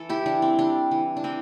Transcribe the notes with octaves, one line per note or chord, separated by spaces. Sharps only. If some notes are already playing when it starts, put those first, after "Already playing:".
Already playing: E3 A4
E4 G4
E3 D4
C4
G3 D4
E3
D4
E3 C4